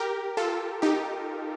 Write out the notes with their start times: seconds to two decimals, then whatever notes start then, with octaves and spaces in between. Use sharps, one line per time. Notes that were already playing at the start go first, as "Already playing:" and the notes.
Already playing: G4 A#4
0.37 F4 A4
0.82 D#4 G4